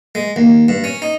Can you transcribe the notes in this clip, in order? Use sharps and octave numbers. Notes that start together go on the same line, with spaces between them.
G#3
D#2
G2
C#4
D#4